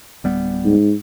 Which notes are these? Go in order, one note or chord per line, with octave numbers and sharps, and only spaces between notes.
D1 G3 B3
G#2